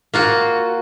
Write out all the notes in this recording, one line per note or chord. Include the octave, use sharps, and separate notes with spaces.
A#3 F4 F#4